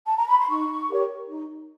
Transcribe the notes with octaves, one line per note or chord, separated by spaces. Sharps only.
A5
A#5
B5
C6
D#4 C#6
G4 A#4 C#5
D#4